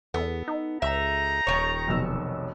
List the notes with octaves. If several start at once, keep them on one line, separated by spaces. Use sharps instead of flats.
E2 B3 A4
D#4
C#2 D#4 E5 A#5
D#1 D#3 C#5
F1 B1 E6